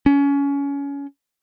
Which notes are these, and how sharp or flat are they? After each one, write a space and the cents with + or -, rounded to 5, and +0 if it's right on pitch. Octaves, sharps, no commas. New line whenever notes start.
C#4 +25